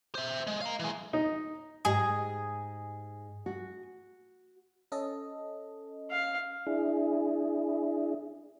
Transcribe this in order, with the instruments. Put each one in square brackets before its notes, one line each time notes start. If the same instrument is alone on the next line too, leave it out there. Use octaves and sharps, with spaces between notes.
[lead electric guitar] C5 E5
G#3
F5 A#5
E3 G#3
[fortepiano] D#4
[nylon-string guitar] G#2 G4 D#5 [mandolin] G#4
[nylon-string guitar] F#4
[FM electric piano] C#4 A4 D#5
[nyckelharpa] F5
[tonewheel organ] D4 E4 G#4